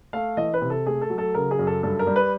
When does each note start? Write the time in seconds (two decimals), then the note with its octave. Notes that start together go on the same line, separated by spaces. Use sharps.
0.13 A3 F5
0.37 E3 D#5
0.54 B4
0.61 C3
0.70 A4
0.86 A3 G#4
1.02 A4
1.10 F#3
1.18 A4
1.34 C#3 A#4
1.51 G#4
1.59 F#2
1.67 A4
1.83 G2 A4
1.99 A#4
2.07 G3
2.16 B4